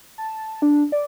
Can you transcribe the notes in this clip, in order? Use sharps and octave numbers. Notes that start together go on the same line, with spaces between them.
A5
D4
D5